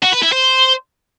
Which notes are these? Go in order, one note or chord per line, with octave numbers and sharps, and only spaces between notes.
F#4
B4
E4
C5